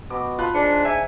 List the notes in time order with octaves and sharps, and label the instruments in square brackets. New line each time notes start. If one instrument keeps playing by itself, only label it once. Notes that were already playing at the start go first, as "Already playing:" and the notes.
[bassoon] B2 [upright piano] D6
[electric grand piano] F4 [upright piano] A5 B5 F#6
[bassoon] G#2 [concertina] D4 [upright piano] C#7
[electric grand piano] E5 [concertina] G#5